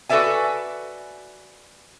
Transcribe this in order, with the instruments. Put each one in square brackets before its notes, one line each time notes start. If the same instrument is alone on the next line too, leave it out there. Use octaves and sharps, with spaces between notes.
[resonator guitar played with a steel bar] F#4 A4 B4 D5 E5 G#5